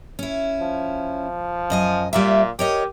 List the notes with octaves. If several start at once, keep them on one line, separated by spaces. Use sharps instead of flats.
C#4 E4
F3
F#2 D#5 G#5
A#2 G3 F#4 E5
G4 A#4 C#5 D#5